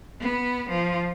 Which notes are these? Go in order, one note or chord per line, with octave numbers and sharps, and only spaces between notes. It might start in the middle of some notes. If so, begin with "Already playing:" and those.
B3
F3